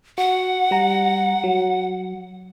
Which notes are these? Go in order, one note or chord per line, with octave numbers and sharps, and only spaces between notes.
F#4 F#5
G3 A#5
F#3